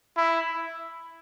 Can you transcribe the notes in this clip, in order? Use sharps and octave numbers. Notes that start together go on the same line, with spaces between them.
E4